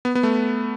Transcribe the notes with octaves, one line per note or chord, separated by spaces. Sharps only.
B3
B3
A3